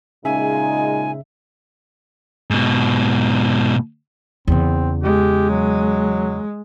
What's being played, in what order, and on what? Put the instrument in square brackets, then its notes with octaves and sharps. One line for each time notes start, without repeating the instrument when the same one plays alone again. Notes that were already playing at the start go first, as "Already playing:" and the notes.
[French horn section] A#2 G#3 D#4 [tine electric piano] C#3 E5 [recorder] G#5
[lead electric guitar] G#2 B2
[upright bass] E2 C#3 [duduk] C4
[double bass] G#3 [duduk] G4
[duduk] F#3